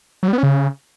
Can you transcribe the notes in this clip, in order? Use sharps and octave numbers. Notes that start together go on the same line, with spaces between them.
F#3
G3
B3
C#4
C#3